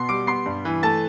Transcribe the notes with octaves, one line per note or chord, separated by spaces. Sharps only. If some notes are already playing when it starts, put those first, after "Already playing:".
Already playing: B2 B3 C6 C7
G3 D6 D7
B3 C6 C7
G2
E3
A3 A5 A6